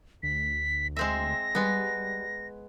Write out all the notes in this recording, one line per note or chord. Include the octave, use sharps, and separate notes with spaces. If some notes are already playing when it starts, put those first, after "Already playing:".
D2 B6
G#3 C4 E5 A#6
G3 G#3 B3